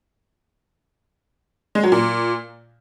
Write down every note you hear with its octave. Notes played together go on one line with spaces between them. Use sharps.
G#3
F#3
A#2